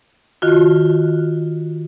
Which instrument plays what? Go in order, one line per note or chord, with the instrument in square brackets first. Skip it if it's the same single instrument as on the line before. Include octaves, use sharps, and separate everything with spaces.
[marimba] D#3 F4 F#4